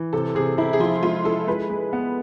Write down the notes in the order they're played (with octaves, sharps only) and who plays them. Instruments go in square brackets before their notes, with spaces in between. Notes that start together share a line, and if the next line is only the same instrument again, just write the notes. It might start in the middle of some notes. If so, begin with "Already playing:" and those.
Already playing: [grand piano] E3
[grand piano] C3 [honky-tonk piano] A4
[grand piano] C3 [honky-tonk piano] G#4
[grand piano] C3 [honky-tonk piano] E4
[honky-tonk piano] G#4
[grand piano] F3 [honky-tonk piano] F4
[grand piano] G#3 [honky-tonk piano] F4
[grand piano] E4 [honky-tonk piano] A4
[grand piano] G#3 [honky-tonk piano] B4
[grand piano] G#3
B3